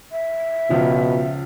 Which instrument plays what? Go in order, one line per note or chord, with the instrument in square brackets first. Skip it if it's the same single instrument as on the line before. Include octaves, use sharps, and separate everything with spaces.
[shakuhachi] E5
[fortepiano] C#2 F3 [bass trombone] B2